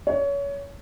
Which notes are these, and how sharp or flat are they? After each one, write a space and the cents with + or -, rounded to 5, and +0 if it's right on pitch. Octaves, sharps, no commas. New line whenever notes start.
C#5 +25